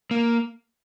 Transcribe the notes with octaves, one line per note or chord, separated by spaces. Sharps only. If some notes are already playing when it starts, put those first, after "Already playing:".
A#3